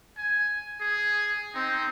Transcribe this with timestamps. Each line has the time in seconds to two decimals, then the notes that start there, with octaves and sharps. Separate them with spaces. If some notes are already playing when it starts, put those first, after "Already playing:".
0.17 G#5
0.81 G#4
1.54 C4 D#4